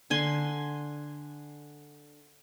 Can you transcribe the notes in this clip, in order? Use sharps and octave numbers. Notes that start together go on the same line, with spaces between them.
D3 G#5 C6